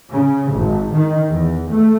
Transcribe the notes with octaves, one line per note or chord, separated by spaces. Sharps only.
C#3
G#1
D#3
E2
A3